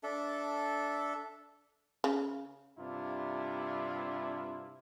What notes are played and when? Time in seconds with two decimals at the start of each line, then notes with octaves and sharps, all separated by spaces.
0.03 D4 A4 E5
2.04 C#3
2.78 G2 C3 D4 E4 F4